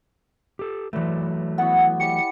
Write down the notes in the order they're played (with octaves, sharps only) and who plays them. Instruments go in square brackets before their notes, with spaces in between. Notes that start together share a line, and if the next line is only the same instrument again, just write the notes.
[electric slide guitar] G4 A4
[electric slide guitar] E3 F#3 A3 [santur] B4 D5
[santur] B3 E4 F#4 [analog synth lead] F#5
[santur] G4 D5 [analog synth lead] C#7